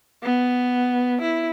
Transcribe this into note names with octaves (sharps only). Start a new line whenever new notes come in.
B3
E4